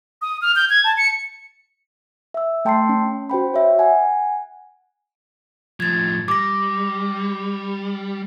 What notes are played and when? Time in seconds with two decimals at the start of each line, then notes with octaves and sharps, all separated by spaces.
0.22 D#6
0.42 F6
0.56 G6
0.70 G#6
0.84 A5
0.98 C#7
2.34 E5 E6
2.65 A3 G5 A5 C6 E6 C7
2.89 C#4
3.30 F#4 C5 G5 B5
3.54 C#5 E5
3.79 F#5 G#5
5.80 A2 F3 G#6 A6
6.28 G3 D6 A#6